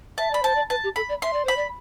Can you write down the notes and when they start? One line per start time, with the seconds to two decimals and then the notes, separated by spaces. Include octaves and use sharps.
0.18 E5 A5
0.31 D5 B5
0.42 C5 A5
0.55 D5
0.70 B4 A5
0.84 G4
0.96 A4 B5
1.09 D5
1.22 E5 C6
1.33 D5
1.45 C5 B5
1.56 D5